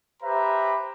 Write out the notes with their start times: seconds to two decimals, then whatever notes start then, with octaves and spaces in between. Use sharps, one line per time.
0.23 G4 B4 C5 E5 A#5 B5